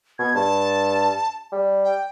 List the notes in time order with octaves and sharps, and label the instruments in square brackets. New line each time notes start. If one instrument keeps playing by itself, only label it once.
[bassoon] B2 [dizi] G#6
[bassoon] G2 [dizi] A5
[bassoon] G3
[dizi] G5